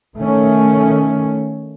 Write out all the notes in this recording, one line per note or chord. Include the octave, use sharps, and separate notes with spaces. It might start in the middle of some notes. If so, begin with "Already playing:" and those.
D#3 A3 C#4